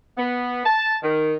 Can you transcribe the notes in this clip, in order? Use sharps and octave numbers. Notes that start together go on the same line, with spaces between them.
B3
A5
D#3